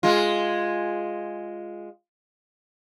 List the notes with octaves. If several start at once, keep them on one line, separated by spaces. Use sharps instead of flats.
G#3 F4